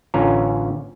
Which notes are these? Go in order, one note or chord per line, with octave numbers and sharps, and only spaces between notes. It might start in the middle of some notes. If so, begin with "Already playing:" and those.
A1 D3 C#4 F4 A#5